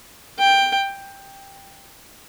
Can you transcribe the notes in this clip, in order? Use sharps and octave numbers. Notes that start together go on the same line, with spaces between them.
G5